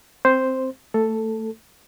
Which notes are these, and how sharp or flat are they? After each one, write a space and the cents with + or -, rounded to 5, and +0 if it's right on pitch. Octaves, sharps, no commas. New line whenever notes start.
C4 +0 C5 +0
A3 +20 A4 +5